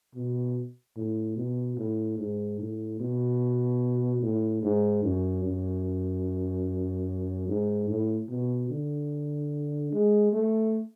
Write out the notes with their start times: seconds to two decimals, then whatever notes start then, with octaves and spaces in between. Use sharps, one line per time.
0.15 B2
0.97 A2
1.37 B2
1.77 A2
2.18 G#2
2.60 A2
3.00 B2
4.22 A2
4.63 G#2
5.03 F#2
5.44 F#2
7.48 G#2
7.89 A2
8.30 B2
8.70 D3
9.93 G#3
10.33 A3